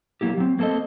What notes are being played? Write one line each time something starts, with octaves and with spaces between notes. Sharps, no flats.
F#3 A#3 E4 G4
F#3 C4
A#3 C4 A4 C5 D#5